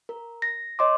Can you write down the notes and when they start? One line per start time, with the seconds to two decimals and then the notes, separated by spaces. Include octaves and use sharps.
0.09 A#4
0.42 A#6
0.79 C#5 D#5 C6 D6